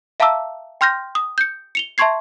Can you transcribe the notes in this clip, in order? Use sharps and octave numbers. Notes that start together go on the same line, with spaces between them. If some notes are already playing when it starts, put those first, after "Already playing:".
E5 F5 A5 A#5 D6 E6
G5 C6 F6 G6 A#6
D#6
G6 C#7
C#7 F7 G7
E5 A5 C6 C#6 G#6 C7